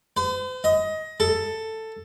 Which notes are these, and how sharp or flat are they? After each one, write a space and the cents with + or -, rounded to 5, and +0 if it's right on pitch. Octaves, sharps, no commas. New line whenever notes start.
C5 -45
D#5 +20
A4 +10